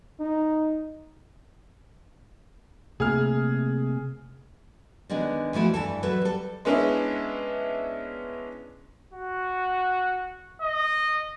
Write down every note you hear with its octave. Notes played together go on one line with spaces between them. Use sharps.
D#4
C3 A3 A#3 G#4 F6
D3 D#3 G#3 B3 D4
E3 F3 A3 E4 F#4
G2 E3 A4
F#3 A4 B4 E5
G3 A4
G#3 B3 C#4 D4 E4
F#4
D#5